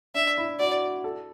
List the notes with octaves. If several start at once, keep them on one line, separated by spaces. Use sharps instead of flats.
D4 E5
E4
F#4 D5
A4